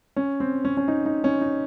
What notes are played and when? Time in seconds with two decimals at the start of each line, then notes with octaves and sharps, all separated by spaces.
0.16 C#4
0.40 C4
0.65 C#4
0.77 C#4
0.88 D#4
1.06 D#4
1.24 C#4
1.41 D#4